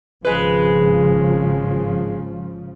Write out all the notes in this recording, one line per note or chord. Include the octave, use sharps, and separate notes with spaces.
G#1 C#3 F3 G#3 B4